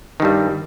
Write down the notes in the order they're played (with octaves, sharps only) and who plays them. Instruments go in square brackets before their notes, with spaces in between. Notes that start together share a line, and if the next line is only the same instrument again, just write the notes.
[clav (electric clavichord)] D#3
G2
G3